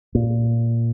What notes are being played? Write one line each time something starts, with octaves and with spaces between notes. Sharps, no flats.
A#2